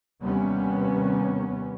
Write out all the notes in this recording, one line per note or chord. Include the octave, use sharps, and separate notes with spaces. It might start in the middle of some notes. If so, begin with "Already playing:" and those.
D#2 C3 G3 B3 C#4